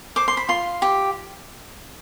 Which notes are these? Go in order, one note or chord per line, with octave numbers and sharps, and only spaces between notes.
C5 D6
C6
B5
F4 C6
G4